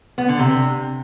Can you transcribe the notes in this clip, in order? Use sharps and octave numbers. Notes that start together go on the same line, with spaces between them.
B3
D3
C3